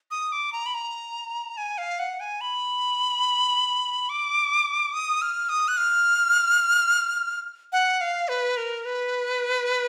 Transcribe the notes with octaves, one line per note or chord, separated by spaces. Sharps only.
D#6
D6
A#5
B5
A#5
G#5
F5
F#5
G#5
B5
D6
D#6
F6
D#6
F#6
F6
F#5
F5
B4
A#4
B4